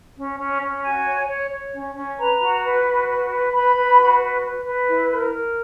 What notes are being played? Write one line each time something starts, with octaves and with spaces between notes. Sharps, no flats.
C#4
C#4
C#4
F#4 G#5
C#5
C#5
C#5
C#4
C#4
B4 A#5
F#4
B4
F#4
B4
B4
B4 B5
B4
F#4
B4
B4
B4
E4
A#4
A#4